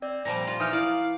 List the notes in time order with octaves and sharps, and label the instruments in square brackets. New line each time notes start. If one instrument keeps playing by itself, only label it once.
[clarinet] C4 [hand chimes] D5
[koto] A#2 F3 G3 [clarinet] A#5
[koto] F4
[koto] E3 [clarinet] D#4 [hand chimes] D#6 F6
[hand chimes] E4 [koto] D5 [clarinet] F5